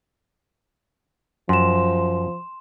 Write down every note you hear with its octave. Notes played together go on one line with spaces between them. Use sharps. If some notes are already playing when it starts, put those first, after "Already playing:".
F#2 F3 C6 E7